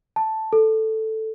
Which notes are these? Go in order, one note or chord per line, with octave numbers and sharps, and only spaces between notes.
A5
A4